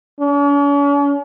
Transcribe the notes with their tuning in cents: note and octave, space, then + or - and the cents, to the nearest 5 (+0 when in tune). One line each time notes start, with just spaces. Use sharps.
C#4 +45